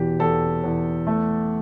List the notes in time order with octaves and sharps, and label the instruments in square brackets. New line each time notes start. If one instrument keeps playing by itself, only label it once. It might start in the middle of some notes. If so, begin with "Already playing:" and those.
Already playing: [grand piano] E2 B2 G4
E2 A4
E2
A3